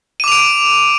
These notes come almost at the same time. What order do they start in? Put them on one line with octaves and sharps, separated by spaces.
D#7 D6 F7 D7